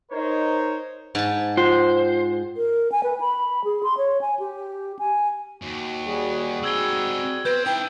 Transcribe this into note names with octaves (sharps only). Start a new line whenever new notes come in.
D#4 A#4 C5 C#5
G#2 A5
F4 C5
A#4
G#5
B4
B5
G#4
C6
C#5
G#5
G4
G#5
D#2 F#4
G3 F#4 G#4
C4 D#4 E6 G#6 G7
B3 C4 B4 G6
D#4 E4 G5 A5